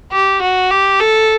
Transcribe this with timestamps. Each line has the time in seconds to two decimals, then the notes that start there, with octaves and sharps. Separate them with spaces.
0.12 G4
0.42 F#4
0.71 G4
1.00 A4